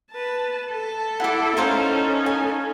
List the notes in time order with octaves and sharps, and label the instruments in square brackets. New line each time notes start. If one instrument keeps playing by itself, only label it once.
[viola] B4 A5
[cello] A4 [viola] A5
[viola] E4 [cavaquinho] F#5 D6
[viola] C#4 D#4 [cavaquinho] A#4 C5 F5
[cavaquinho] G#5